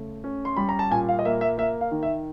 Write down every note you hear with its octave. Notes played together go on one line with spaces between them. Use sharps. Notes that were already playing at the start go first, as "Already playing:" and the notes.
Already playing: C#3 A3
C#4
C6
G3 B5
A#5
A5
A#2 G#5
F5
D#5
A#3 E5
E5
A#3 E5
F5
D#3
E5